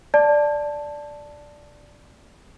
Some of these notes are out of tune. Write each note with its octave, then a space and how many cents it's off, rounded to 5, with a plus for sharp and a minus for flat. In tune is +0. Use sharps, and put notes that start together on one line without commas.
D5 +0 A5 +0